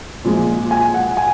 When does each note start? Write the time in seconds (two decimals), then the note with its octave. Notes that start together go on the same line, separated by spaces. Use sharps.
0.25 A#2 F3 G#3
0.71 G#5
0.94 F#5
1.17 G#5